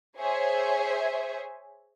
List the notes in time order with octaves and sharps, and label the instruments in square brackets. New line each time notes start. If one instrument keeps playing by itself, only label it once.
[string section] G#4 C5 C#5 E5 G#5